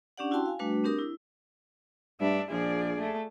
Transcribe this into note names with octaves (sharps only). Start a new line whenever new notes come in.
C#4 D4 G4 D5 F#5
E4 F#4 G5 A5 C6
F5 G#5
G3 A3 D4 F#4 B4
C4 D4 G4 A#4 D#6
E4
G2 A3 D4 E5
A#1 F3 G#4 D5
A3